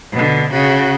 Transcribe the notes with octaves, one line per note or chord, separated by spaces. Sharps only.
B2 D3
C#3 F#4